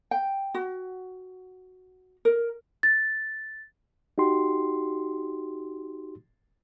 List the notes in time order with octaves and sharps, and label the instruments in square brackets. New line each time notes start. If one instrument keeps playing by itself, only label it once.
[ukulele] G5
F#4
A#4
[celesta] A6
[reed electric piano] D#4 F#4 G4 C6